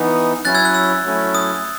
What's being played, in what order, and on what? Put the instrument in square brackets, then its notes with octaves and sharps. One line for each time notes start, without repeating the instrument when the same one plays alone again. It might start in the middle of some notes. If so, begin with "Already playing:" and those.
Already playing: [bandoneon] E3 B3 D#4
[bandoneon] F#3 C#4 E4 [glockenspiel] F#6 A6
[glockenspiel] E6 G#6
F#6
E6
[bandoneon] F#3 A3 C#4 E4
[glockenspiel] D#6